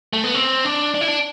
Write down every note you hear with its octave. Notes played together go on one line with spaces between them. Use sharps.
A3
B3
C4
D4
D4
E4
D4